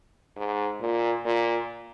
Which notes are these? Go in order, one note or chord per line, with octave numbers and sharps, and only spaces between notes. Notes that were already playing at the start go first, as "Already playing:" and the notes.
G#2
A#2
A#2